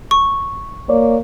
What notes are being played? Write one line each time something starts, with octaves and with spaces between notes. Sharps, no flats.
C#6
A#3 C#5 D5